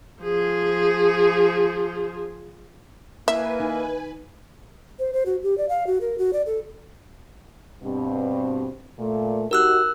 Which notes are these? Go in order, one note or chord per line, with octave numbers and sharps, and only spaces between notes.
F3 G#4
A#3 E4 B4 E5 G#5
D#4
C5
C5
F#4
G4
D5
F5
F#4
A#4
F#4
D5
A4
G2 B2 C4
A#2 A3
D#4 F#4 G4 A#4 E6 F#6